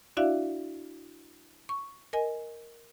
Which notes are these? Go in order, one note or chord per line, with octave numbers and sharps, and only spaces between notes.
D4 E4 F#4 D5 E5 F5
C#6
A#4 D#5 G#5